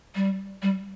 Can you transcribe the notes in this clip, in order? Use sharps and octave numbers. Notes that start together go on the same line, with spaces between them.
G3
G3